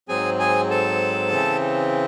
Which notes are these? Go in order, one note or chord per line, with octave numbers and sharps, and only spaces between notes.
G#2 F#3 C4 G#4 G#5
G#4 G#5
A4 A5
C#3 E3 C4